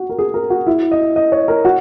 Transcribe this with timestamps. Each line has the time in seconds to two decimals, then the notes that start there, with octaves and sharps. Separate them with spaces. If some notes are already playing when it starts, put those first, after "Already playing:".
Already playing: F#4
0.09 A#4
0.19 G#4
0.34 A#4
0.50 F#4
0.67 E4
0.91 D#5
1.16 D#5
1.32 C#5
1.48 A#4
1.65 F#4